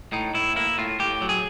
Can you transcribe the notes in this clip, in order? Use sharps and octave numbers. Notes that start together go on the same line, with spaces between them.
A2 D#4
A2 E4
A#3 E4
A2 F4
A2 G4
F#3
G#4